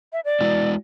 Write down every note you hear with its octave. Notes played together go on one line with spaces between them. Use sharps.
E5
D5
G#3 E4 F#4